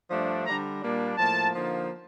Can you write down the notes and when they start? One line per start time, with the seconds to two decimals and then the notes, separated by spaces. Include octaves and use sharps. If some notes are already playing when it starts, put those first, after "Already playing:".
0.11 G2 F3 A3 D4
0.46 D3 G3 D4 A#5
0.82 A#2 G3 A#3 D4
1.18 A2 F3 A#3 A5
1.53 D3 F3 A#3 D#4